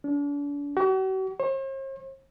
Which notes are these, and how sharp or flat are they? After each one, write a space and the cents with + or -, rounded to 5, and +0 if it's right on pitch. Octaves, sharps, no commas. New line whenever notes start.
D4 -40
F#4 +45
C5 +45